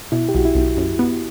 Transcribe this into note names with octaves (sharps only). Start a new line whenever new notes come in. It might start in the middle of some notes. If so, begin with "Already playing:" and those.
B2 E4
G4
B1 F#4
E4
B1
F#2
B3